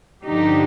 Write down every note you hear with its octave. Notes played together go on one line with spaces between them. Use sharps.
G2 D3 F3 D#4 G4